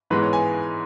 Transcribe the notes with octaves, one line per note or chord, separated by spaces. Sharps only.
G#2 E3 G#3 B3 B4
C#5
G#5